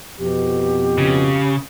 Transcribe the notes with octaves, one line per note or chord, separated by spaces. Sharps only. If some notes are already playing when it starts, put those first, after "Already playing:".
F2 B2 G4
C#3